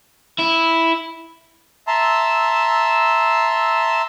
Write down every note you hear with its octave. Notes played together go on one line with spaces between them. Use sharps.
E4
E5 A5 A#5 C6 E6